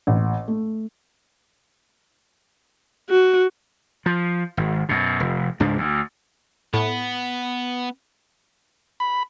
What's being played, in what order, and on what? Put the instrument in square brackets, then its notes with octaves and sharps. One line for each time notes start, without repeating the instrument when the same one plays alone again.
[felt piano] A1
A3
[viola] F#4
[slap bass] F3
G#1
F#2 B2
F1
C#2 G#2 D4
D2
[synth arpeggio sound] A2 [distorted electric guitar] B3
[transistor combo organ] B5